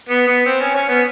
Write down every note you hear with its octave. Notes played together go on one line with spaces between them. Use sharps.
B3
B3
C4
C#4
C#4
B3